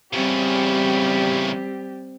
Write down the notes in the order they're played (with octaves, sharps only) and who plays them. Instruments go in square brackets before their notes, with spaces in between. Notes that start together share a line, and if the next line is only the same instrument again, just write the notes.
[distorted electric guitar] E2 C#3 [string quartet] G3 G4 [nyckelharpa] C4